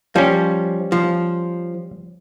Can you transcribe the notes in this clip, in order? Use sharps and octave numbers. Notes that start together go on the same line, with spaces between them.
F3 G3 C#4
F3